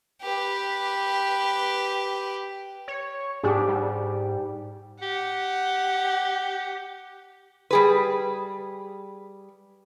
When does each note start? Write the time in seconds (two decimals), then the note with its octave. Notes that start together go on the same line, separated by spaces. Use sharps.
0.22 G4 B4
2.88 C#5
3.44 G#2 D4 G4 G#4
3.68 G3
5.02 G4 F#5
7.71 G3 G#4 B4